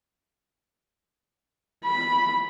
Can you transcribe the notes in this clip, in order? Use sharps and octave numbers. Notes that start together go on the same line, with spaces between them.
B5